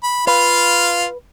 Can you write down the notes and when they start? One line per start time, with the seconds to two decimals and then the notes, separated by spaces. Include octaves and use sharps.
0.03 B5
0.27 F4 B4 F5